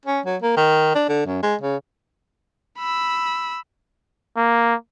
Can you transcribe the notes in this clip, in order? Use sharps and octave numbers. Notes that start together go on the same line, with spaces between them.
C#4
F#3
A#3
D#3
D4
D3
F#2
G#3
C#3
B5 E6
A#3